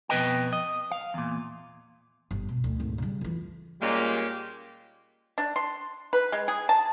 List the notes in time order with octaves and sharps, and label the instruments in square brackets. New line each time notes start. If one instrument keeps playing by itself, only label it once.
[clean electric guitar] F2 B2 B4 D#5 G5
D#5
F5
E2 A#2
[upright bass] G1
B2
D2
G#1
C#3 G3
F2 E3
[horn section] A#2 G3 G#3 A#3 C#4 G4
[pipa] D4
C6
B4
G#3
G#4
A5